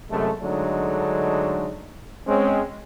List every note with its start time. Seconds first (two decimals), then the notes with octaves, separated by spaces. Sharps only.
0.11 F#2 C3 G#3 A3
0.42 D3 F#3 G#3 A3 D4 D#4
2.27 G#3 C4 C#4